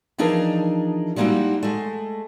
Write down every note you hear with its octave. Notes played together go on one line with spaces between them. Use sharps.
E3 F3 D4 D#4 G#4 A#4
G3 G#3 A#3 D#4 E4 F#4
G#3 A3